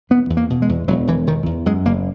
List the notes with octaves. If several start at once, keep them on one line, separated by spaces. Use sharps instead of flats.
E1 B3
E2
A#3
B2
G#3
E2
E1 F#3
E1 E3
E1 D#3
E2
F#2 G#3
F#1 A#3